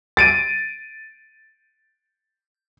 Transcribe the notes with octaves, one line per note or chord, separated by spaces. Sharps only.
A6 D7 D#7